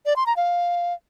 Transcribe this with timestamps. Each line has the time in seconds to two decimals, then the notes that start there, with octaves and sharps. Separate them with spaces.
0.06 D5
0.16 C6
0.26 A#5
0.37 F5